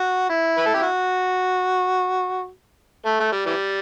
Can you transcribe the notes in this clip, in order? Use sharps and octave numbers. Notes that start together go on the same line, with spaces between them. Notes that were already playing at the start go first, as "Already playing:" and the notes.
Already playing: F#4
E4
B4
A4
G4
F#4
A3
A3
G3
E3 G3